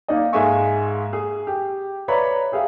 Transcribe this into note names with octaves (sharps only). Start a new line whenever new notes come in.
A#3 D#4 D5 D#5
G#2 G#3 A#3 E5 G#5 C#6
G#4
G4
B4 C#5 D5 E5 A#5 B5
G4 G#4 E5 F5